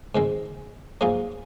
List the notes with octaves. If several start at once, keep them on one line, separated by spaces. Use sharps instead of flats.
G#2 D#3 G#3 C4
G#2 F#3 A#3 F4 G#4